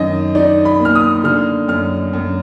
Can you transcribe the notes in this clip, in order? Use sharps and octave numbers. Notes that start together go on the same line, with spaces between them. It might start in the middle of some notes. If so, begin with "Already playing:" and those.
Already playing: F#2 D#3 D#5
D#4 D5
B5
A#3
F6
D#6
D3 F6
F#2 F6
F#2